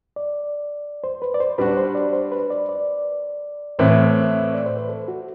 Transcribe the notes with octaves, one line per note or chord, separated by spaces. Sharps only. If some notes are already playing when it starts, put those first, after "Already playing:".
D5
C5
B4
D5
C5
G3 D4 F#4 B4
B4
C5
D5
C5
B4
D5
D5
A2 E3 A3 C4 C5
B4
C5
D5
C5
B4
A4
F#4